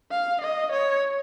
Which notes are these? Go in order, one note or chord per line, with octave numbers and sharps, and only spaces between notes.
F5
D#5
C#5